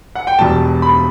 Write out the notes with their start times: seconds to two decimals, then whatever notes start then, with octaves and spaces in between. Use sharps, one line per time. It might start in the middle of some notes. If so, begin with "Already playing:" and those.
0.15 F#5
0.27 G5
0.39 E1 E2 B2 G3 A5
0.82 B5